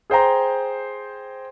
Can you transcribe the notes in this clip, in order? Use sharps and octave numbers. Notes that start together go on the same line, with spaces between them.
G#4 C5 G5 A#5